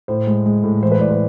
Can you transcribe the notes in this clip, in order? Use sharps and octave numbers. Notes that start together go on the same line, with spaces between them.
A2 C5
G#3
G#3
A2
E3 C5
B4
A2 D5
B4